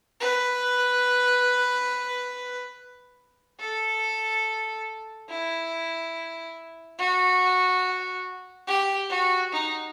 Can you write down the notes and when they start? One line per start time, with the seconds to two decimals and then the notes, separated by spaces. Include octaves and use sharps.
0.20 B4
3.59 A4
5.28 E4
6.98 F#4
8.67 G4
9.10 F#4
9.52 D#4